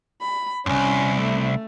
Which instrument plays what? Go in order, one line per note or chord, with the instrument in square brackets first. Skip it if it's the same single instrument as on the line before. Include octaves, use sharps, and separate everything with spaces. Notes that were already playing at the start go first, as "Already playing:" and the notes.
[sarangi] B5
[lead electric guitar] C2 F#2 [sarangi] C#4
[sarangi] A3